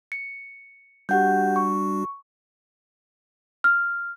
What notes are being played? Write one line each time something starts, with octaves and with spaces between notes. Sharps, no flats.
C#7
G3 D4 F#4 G4 F#5 G6
C#6
F6